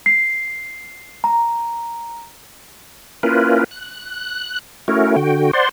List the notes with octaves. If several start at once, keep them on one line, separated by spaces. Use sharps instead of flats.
C7
A#5
A#3 C#4 E4 F4 A#4 B4
F#6
A3 C#4 E4 F#4 A#4
D3 F#4 G5
C5 D5 F#5 C6